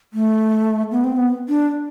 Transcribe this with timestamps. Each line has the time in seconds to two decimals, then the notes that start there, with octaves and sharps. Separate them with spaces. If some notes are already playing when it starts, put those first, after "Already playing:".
0.13 A3
0.91 B3
1.04 C4
1.17 B3
1.49 D4